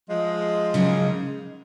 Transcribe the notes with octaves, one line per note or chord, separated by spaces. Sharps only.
F3 G#3
C#3 F#3 A#3 D#4